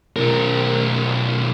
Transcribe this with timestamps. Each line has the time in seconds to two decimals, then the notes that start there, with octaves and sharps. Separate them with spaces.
0.16 B1 A#4